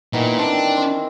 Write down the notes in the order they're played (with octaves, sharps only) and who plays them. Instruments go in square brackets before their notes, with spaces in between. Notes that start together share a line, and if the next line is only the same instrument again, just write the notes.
[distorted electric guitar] A#2 [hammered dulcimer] D#3 E3 B3
[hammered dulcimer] C4 G4 A#4 [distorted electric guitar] D4
[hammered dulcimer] C4